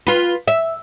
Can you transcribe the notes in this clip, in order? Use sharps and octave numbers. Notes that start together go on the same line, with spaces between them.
F4 B4
E5